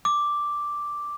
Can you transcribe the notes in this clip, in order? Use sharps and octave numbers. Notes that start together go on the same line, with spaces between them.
D6